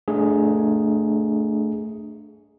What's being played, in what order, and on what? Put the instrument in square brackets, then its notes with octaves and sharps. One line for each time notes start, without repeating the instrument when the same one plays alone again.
[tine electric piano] A3 D4 G#4